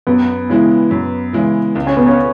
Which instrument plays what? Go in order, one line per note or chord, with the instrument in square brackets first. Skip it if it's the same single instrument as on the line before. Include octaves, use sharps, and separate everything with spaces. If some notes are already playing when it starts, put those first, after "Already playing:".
[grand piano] F#2 [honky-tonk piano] B3
[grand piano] C#3 E3 G#3 E4
F#2
C#3 E3 G#3 E4
C#2
[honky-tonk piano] C#4
B3
C#4